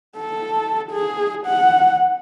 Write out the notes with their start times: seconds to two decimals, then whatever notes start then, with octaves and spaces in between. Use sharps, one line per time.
0.18 A4
0.92 G#4
1.47 F#5